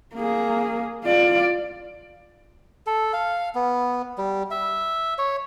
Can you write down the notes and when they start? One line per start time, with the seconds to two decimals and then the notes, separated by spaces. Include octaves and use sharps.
0.16 A#3 G#4
1.04 F4 D5
2.87 A4
3.13 F5
3.55 B3
4.18 G3
4.51 E5
5.18 C#5